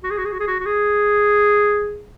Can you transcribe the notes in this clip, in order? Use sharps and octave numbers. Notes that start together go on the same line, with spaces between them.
F#4
G#4
F#4
G#4
F#4
G#4
F#4
F#4
G#4